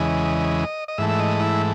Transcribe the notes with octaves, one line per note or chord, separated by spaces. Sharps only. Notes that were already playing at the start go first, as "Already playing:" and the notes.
Already playing: E2 C#3 E3 G#3 D#5
D#5
G#2 E3 A3 E5
E5
D#5
E4